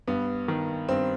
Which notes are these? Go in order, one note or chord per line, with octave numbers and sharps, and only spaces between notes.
G2 B3
D#3
G2 C4